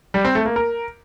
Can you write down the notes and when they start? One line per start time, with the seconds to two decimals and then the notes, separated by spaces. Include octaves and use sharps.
0.14 G3
0.25 C4
0.35 A3
0.46 A#3
0.56 A#4